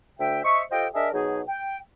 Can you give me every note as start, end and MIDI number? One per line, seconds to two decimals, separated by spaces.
0.19 0.40 38
0.19 0.40 76
0.19 0.40 79
0.44 0.62 72
0.44 0.62 75
0.44 0.62 76
0.44 0.62 85
0.71 0.87 65
0.71 0.87 67
0.71 0.87 69
0.71 0.87 72
0.71 0.87 75
0.71 0.87 79
0.94 1.08 62
0.94 1.08 68
0.94 1.08 70
0.94 1.08 75
0.94 1.08 76
1.13 1.41 47
1.13 1.41 54
1.13 1.41 63
1.13 1.41 68
1.48 1.77 79